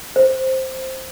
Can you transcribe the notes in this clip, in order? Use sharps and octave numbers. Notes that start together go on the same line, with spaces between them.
C5